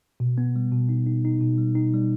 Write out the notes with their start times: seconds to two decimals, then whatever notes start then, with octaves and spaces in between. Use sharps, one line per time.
0.20 B2
0.38 B3
0.56 G3
0.72 B2
0.89 D#4
1.06 D#4
1.25 D#4
1.41 B2
1.58 G3
1.75 D#4
1.94 G3